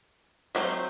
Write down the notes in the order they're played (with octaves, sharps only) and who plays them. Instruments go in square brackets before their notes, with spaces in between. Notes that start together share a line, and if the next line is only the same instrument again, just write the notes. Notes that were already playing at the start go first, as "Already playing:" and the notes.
[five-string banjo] F#3 A3 C4 E4 C5